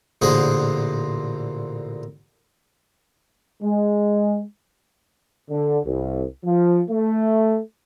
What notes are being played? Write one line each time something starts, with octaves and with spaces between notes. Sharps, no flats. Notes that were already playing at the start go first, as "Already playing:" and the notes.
A1 A#2 D3 G#4 C5 F#5
G#3
D3
C2
F3
A3